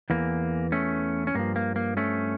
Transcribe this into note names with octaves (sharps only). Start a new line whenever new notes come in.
E2 E3 A#3
A3 C#4
C#4
G2 F3 A#3
A#3
A#3
A3 C#4